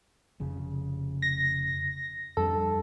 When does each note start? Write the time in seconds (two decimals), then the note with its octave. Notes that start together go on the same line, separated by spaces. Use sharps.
0.40 F1 C#3
1.22 A#6
2.37 F2 G3 D4 A4